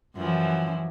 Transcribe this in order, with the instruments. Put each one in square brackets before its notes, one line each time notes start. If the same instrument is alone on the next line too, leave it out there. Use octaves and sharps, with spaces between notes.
[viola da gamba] F#2 E3 F3